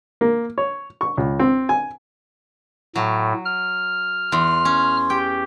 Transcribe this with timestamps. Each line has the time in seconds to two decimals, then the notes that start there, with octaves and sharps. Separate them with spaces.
0.21 A#3
0.58 C#5
1.01 C#6
1.17 C#2
1.39 C4
1.69 G#5
2.96 A2 F#3
3.45 F6
4.32 E2 C6
4.65 C#4
5.10 G4 G5